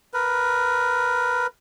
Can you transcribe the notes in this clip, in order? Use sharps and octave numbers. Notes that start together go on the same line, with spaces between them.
A#4 B4